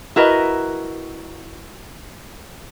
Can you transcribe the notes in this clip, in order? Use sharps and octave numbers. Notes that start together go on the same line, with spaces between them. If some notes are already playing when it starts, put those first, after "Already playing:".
E4 F#4 A#4 B4 D#5